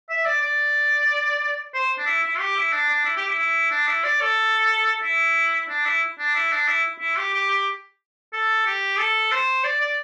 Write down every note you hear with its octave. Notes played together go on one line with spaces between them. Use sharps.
E5
D5
D5
C5
D4
E4
E4
G4
E4
D4
D4
E4
G4
E4
E4
D4
E4
D5
A4
E4
D4
E4
D4
E4
D4
E4
E4
G4
G4
G4
A4
G4
A4
C5
D5
D5